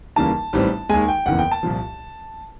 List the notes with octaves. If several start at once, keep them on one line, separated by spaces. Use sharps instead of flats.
D#2 C#3 E3 G3 A#3 A5
A1 G#2 E3 G3 C4
D#2 D#3 G#3 G#5
G5
F#1 E2 C#3 E3 F#5
G5
A5
C2 A#2 F3